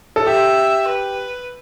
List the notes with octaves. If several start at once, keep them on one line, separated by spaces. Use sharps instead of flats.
A4
G4 E5
B4